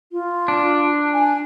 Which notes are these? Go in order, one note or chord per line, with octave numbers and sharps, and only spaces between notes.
F4
D4
G#5